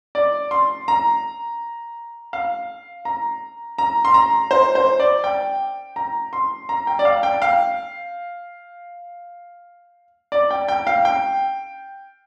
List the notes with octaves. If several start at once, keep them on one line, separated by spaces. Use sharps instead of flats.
D5
C6
A#5
F5
A#5
A#5
C6
A#5
C5
C5
D5
G5
A#5
C6
A#5
G5
D5
F5
G5
F5
D5
G5
G5
F5
G5